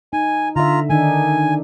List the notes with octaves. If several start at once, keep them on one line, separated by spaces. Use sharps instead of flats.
D#4 G#5
D3 F4 E5 A#5
D#3 D4 D#4 G#5